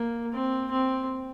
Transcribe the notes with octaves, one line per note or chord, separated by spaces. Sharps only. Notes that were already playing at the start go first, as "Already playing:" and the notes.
Already playing: A#3
C4
C4